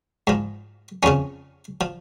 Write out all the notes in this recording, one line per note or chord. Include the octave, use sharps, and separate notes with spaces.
G#2 F3
F2 C#3 F3 C#4
F3